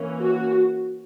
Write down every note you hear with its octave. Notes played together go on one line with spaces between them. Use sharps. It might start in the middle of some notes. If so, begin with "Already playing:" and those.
Already playing: E3 A#3 C#4
F#4